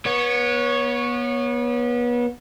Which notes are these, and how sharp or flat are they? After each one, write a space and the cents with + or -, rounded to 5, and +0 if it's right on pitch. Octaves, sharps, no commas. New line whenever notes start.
B3 -30 C#5 +0